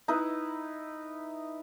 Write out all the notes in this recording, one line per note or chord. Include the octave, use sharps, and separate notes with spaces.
D#4 E4 B4